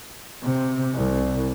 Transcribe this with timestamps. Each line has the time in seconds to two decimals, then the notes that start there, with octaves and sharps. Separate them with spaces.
0.43 C3
0.94 C2